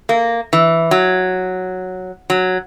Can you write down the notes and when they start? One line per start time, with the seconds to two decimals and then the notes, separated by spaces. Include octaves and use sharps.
0.09 A#3
0.53 E3
0.91 F#3
2.30 F#3